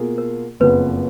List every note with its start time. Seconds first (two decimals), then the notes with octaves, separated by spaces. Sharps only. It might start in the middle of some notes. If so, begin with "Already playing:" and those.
Already playing: B2 A#3 F4 G#4
0.18 A#4
0.60 F#1 F2 C#3 F3 B3 B4